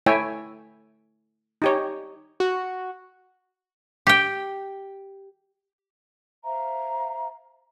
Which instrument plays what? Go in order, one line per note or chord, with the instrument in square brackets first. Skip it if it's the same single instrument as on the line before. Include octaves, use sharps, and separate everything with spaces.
[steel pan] A3 E4 C#5 E5 G5 G#5
D#4 G4 C#5
[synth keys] F#4
[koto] G4 G5
[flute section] C5 E5 F5 A#5